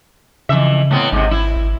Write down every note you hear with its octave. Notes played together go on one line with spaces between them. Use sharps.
F2 C#3 E3 E5
A2 B3 C4
G#1 G#2 C3
E4
G#1